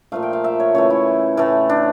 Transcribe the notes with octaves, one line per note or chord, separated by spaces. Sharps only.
A#2 F3 A3 F5
G5
F5
E5
C#5
C#3 E3 A3 C#5
E4
A2 E3 A3
D4